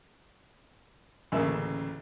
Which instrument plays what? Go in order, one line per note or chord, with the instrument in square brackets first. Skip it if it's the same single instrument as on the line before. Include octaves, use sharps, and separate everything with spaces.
[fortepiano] A1 D2 C#3 A#3 E5